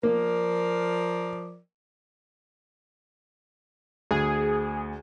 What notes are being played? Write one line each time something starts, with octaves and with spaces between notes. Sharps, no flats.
F3 A#3 A#4 D5
D2 G#4